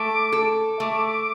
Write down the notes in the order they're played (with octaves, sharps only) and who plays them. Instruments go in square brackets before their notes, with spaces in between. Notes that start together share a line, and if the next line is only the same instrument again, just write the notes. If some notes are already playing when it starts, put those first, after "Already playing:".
Already playing: [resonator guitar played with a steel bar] A3 [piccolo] D6
[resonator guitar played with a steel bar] A4 [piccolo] D6
[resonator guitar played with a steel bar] A3